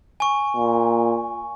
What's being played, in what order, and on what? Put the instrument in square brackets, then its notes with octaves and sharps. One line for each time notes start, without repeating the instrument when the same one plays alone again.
[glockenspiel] G#5 C#6
[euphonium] A#2